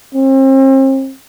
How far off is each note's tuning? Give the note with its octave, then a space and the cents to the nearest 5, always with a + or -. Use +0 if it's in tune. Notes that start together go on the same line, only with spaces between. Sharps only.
C4 +40